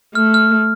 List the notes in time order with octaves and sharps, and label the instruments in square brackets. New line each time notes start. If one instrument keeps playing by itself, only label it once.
[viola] A3 [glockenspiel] F6
[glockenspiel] F6